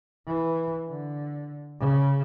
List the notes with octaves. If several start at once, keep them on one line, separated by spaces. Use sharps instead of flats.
E3
D3
C#3